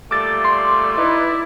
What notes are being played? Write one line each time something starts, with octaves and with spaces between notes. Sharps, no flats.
A#2 G3 A3 D6 E6 A6
D5 C6
D#4 E4 B4